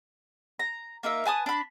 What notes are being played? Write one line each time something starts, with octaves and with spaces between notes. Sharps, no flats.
A#5
A#3 D#4 A#4 E5
B4 G#5 A5 D#6
D4 B5